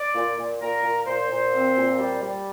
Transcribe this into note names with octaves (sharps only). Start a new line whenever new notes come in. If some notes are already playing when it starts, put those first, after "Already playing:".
Already playing: D5
A#2
A#2
A#2 A#4
A#2
A#2 C5
A#2
C4
A#2
G3
G3